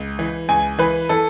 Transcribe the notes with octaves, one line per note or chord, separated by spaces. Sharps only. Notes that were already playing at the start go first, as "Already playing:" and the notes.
Already playing: C#2
E3
C#2 G#5
E3 B4
E3 A4